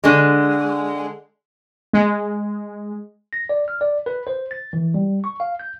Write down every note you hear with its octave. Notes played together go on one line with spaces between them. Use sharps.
D3 G#3
G#3
A#6
D5
F6
D5
B4
C5
A6
E3
G3
C#6
F5
G6